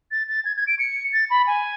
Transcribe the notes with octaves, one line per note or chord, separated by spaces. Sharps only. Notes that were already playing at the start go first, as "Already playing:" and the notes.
A6
A6
G#6
G#6
D7
C#7
A6
B5
G#5